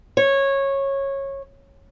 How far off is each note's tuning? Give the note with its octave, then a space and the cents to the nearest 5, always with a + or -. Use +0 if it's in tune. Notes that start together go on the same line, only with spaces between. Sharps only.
C#5 -15